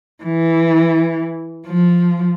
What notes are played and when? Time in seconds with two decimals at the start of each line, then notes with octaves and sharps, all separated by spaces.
0.24 E3
1.67 F3